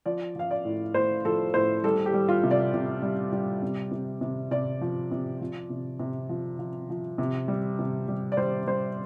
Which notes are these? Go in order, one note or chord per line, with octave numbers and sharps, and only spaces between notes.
F3 D5
F3 F5
D5
A2
A2 C5
F3 A4
A2 C5
G3 A4
G4
G3
F4
C3
D5
C3
G3
G3
C3
C3
C3
C3 D5
F3
C3
F3
C3
C3
F3
F3
F3
C3
G3
C3
G3
D5
G3 C5
G3 C5